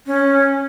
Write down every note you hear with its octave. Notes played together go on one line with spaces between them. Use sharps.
C#4